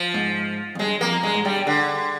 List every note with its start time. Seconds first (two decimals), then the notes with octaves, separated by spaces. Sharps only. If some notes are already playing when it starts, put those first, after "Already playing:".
Already playing: F3
0.14 G#2
0.75 F2
0.79 G2 G#3
1.01 F2 A#3
1.23 G2 G#3
1.34 G#2
1.45 G2 G3
1.56 G2
1.67 D3